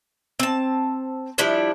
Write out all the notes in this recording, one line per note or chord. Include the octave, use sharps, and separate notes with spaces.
C4 A5
F3 G3 D4 E4